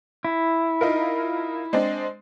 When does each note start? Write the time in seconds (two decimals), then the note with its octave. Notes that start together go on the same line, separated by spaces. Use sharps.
0.25 E4
0.81 D#4 F4 A#4
1.73 G#3 C4 D4